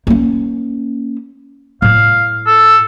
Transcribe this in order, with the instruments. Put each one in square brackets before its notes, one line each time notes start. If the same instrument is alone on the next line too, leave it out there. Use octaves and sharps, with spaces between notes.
[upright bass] A#3 C#4
[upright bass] A2 [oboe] F5
[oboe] A4